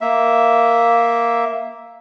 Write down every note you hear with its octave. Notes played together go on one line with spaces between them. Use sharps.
A#3 E5